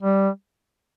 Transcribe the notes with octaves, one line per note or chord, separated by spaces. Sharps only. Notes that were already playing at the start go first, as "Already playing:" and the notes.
G3